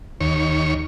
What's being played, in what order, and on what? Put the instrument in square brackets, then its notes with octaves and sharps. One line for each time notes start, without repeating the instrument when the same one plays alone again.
[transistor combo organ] D#2 C#5